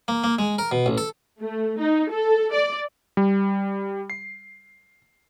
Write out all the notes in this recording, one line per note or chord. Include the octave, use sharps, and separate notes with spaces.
A#3
A#3
G#3
A#4
B2
A1
A4
A3
D#4
A4
D5
G3
C7